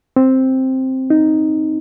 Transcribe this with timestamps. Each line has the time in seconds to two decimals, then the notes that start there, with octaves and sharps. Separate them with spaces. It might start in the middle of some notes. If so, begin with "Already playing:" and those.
0.16 C4
1.10 D#4